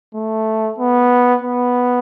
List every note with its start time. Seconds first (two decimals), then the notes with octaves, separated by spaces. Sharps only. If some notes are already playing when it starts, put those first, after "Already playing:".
0.15 A3
0.78 B3
1.42 B3